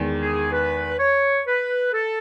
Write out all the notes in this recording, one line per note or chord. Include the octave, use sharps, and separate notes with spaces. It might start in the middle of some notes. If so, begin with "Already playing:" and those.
Already playing: E2 D#3 G#3
G#4
B4
C#5
B4
A4